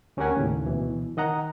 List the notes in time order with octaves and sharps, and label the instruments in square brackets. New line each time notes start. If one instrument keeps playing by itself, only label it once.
[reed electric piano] D2 C#4 G4 A#4 F#5 G#5
D#2 A2 C#3
D2 B2 E3
D#3 D#5 F#5 A#5